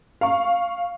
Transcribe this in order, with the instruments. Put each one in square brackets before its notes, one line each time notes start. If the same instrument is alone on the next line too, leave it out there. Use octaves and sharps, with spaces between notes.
[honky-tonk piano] F5 C#6